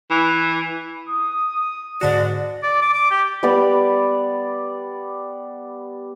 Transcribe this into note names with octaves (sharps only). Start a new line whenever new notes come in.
E3
D#6
G#2 D3 F#4 D5
D5
D6
D6
G4
G3 B3 D5